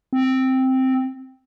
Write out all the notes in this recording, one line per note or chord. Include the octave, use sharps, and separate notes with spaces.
C4